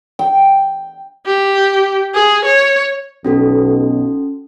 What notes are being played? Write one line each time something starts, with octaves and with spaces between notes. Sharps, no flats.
G5
G4
G#4
C#5
B1 C#4 F#4 A4